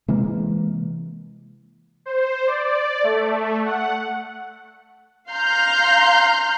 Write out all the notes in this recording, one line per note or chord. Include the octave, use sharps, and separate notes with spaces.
C3 E3 G#3 A#3
C5
D5
A3
F#5
F5 A#5 C6 F6 G6